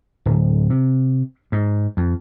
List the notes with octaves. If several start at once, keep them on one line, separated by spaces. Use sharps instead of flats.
D1
C3
G#2
F2